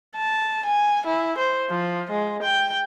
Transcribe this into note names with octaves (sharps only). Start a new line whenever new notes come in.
A5
G#5
E4
C5
F3
G#3
G5